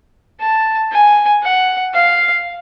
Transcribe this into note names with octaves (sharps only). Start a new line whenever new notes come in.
A5
G#5
F#5
F5